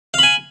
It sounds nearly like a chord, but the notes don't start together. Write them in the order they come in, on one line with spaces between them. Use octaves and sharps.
F5 B5 G#5